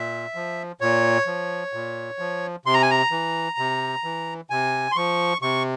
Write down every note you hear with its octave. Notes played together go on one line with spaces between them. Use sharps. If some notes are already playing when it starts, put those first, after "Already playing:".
Already playing: A#2 E5
F3
A#2 C#5
F3
A#2
F3
C3 C6
A#5
G#5
A#5
E3
C3
E3
C3 G#5
C6
F3 C#6
C3 C#6